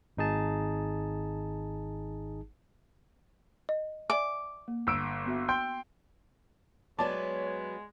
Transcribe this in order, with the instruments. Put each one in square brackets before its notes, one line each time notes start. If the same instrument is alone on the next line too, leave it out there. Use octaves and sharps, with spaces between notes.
[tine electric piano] G#1 D#4 G#4 A5
[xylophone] D#5
[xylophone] D5 G#5 [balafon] E5 [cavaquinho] D6
[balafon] A#3
[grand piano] G1 E6 D7
[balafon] B3 F#4 E5
[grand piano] G5 C6 G6
[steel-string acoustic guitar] F#3 B3 B4 [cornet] G#3 [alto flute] C#5 [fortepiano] D5 A5